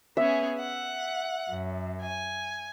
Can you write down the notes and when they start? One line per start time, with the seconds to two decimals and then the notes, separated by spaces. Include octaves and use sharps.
0.17 B3 C#4 G#4 E5
0.58 F#5
1.49 F#2
2.01 G#5